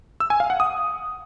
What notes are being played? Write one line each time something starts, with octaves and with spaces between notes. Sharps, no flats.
E6
G#5
F5
F#5
D#6